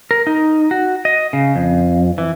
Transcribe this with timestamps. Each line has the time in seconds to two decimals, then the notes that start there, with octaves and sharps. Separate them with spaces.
0.11 A#4
0.27 D#4
0.71 F#4
1.05 D#5
1.33 C#3
1.56 F2
2.18 E3